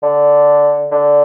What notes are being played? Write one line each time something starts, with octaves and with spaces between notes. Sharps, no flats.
D3
D3